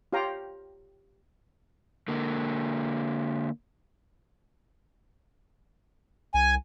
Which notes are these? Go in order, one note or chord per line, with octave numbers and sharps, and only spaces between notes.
F4 G4 C#5 F5 G5 A#5
D3 A#3
C2 G#5